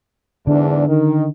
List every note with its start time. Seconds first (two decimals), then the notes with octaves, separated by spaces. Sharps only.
0.47 E2 G#2 D3 D4
0.88 D#3